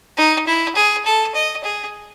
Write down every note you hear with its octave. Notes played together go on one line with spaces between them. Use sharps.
D#4
E4
G#4
A4
D#5
G#4